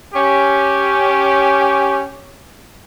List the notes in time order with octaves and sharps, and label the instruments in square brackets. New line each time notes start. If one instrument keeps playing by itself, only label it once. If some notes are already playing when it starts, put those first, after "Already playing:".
[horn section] C#4 G4